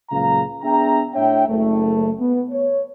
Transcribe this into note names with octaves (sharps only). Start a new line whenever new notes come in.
C#2 A#2 C#3 F#3 F5 A#5
B3 D4 G#4 E5 G5 A#5
A2 D4 C#5 E5 G5
F#1 A3
B3
C#5